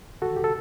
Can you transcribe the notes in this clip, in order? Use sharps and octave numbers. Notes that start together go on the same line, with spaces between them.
F#4 A4
G4
A4